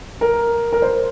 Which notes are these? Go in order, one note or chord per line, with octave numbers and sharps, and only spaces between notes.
A#4
A#4
C5